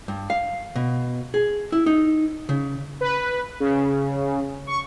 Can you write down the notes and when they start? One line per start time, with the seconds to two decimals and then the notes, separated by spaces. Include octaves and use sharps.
0.08 G2
0.30 F5
0.76 B2
1.34 G#4
1.72 E4
1.86 D#4
2.49 C#3
3.01 B4
3.60 C#3
4.67 C#6